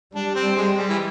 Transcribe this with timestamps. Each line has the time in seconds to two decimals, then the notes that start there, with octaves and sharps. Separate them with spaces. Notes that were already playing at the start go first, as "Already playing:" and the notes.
0.15 G3 D4
0.35 C4
0.56 G#3
0.77 G3
0.89 E3